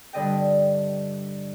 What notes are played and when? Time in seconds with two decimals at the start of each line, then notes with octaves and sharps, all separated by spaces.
0.13 G2 D3 D#5 G5